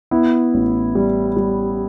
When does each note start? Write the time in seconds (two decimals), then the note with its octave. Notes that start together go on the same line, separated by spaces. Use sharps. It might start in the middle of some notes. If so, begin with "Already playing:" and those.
0.11 B3 E4
0.54 A1
0.95 G3
1.37 G3